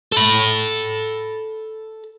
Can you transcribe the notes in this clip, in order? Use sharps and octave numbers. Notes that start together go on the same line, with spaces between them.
A4 B5